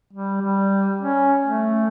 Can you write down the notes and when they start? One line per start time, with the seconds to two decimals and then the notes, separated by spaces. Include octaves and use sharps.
0.13 G3
0.42 G3
1.01 C#4
1.43 A3